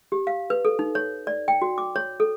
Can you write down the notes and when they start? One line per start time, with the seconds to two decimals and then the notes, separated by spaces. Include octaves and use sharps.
0.12 G4
0.27 F5
0.50 B4
0.65 A4
0.79 D#4
0.95 C#5
1.27 D5
1.48 G5
1.62 F#4
1.78 D6
1.96 C#5
2.20 A4